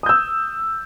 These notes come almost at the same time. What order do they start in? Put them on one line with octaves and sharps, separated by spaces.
D#6 G6 E6